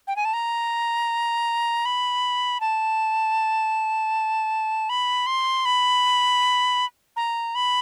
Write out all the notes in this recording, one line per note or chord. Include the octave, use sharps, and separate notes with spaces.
G5
G#5
A5
A#5
B5
A5
B5
C6
B5
A#5
B5